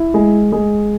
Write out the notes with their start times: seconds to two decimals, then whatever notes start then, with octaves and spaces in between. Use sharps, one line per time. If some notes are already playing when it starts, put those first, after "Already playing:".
Already playing: E4
0.14 G#3
0.52 G#3